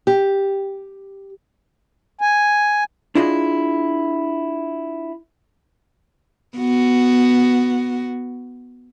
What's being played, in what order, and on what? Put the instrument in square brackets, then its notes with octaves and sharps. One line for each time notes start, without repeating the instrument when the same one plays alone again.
[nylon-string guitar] G4
[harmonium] G#5
[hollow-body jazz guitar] D4 E4 F4 G#4 D#5
[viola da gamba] B3 F#4